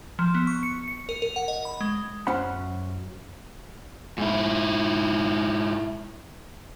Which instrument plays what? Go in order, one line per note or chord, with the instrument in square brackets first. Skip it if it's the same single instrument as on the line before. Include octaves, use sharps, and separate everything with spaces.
[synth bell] F3
B3
C#6
C#7
C#7
A#4
A#4
F#5
D#5
B5
G#3
[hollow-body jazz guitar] F#2 F#3 C#4 C5 F#5 B5
[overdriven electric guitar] G#2 E4